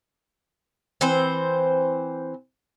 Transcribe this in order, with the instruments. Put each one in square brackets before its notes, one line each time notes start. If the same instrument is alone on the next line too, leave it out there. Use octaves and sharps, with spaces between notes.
[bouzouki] E3 C4 C5